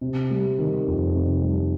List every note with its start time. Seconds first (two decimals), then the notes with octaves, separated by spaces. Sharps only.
0.01 C3
0.31 G3
0.59 D#3
0.87 F2
1.14 C3
1.43 G3